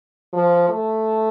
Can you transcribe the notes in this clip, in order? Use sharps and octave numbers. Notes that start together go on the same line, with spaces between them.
F3
A3